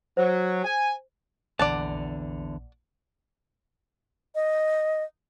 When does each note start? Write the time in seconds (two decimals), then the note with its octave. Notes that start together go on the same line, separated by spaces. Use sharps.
0.17 F#3 C5
0.64 G#5
1.59 A#1 E2 D3 D5 F#5 A5
4.35 D#5